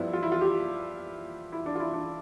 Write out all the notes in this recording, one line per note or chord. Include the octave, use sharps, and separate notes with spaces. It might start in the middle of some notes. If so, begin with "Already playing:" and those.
Already playing: G2 F3 B3 E4
F4
E4
F4
G4
E4
D4
F4
E4
D4